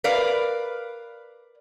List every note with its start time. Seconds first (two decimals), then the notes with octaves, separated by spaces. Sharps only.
0.04 A#4 B4 D5 F5